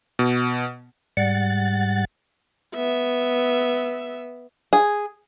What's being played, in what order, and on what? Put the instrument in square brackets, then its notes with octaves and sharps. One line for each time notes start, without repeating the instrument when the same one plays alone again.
[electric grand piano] B2
[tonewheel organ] G#2 G3 F#5 A6
[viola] B3 E5
[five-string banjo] G#4